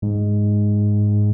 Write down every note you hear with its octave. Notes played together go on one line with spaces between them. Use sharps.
G#2